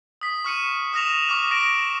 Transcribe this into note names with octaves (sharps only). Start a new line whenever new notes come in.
D#6 B6
C#6 F6 C#7 D#7
C#6 D#6 F6 A#6 E7 F7
C#6 D6 F6
D#6 A#6 D7